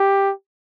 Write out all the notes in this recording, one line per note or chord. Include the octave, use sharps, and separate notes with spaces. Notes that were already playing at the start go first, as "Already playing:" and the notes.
Already playing: G4